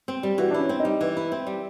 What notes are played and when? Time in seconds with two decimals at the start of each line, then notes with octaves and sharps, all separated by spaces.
0.08 C4
0.23 G3
0.38 E3 F#4
0.51 D4
0.54 C#4 E4
0.69 C4
0.80 D#4
0.85 G3
1.01 E3
1.17 E4
1.32 C4
1.47 G3